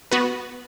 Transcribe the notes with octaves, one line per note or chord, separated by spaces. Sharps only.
B3 F#4 B4